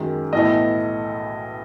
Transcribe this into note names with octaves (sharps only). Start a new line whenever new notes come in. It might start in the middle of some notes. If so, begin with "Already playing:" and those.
Already playing: F#2 D#3 G#3
B1 A2 E3 A3 D#5